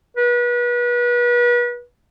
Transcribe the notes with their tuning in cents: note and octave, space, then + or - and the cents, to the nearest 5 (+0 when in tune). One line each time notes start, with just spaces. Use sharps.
B4 -35